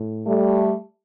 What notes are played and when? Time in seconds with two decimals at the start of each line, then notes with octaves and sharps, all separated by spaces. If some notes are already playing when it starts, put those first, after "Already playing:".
Already playing: A2
0.27 G3 A3